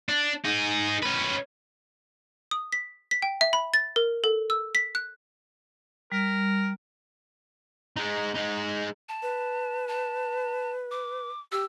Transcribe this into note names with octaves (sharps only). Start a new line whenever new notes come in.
D4
D#4 G#4
C#4 B4
D#6
B6
B6
G5
E5
B5
A6
A#4
A4
E6
B6
F#6
G3 A#4
G#3 D#4
G#3 D#4
A5
B4
A5
D6
G4 E6